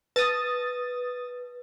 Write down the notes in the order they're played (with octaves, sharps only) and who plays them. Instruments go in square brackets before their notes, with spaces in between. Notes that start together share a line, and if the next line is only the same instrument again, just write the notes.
[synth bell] B4 [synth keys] D#6 A6